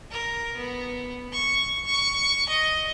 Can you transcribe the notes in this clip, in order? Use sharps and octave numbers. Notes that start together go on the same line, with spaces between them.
A#4
B3
C#6
C#6
D#5